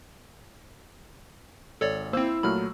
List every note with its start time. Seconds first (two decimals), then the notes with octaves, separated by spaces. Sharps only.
1.81 G#1 A4 C#5 D5
2.13 A#3 C4 E4 C5 E6
2.43 A#2 F#3 A3 B5 F6